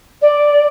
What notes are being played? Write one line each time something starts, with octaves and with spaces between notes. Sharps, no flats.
D5